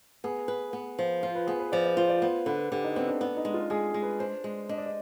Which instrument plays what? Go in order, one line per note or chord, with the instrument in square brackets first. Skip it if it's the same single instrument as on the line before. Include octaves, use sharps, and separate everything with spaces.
[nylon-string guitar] B3 [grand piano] G#4
[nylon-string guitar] B4
B3
F3
[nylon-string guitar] F4 [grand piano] C5
[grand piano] B4
[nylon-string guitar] B3 [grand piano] G#4
[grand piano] B4
[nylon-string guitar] F3 [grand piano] D5
[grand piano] D5
[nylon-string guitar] F4 [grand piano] C5
[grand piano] D5
[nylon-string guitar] B3 [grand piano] C5
[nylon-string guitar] D3 [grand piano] B4
[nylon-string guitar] D3 [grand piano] G4
[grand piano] D#4
[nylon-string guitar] B3 [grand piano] C4
[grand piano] D4
[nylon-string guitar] B3 [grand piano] D4
[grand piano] D#4
[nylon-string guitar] G#3
[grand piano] F4
[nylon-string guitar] G#3 [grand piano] G#4
[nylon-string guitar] G#3
[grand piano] B4
[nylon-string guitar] D4 [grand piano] C5
[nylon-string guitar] G#3
[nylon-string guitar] D4 [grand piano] D#5
[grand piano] D5
D#5